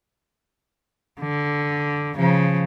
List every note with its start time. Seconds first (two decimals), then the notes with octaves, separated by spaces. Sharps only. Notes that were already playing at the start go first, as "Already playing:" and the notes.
1.20 D3
2.16 C#3 F3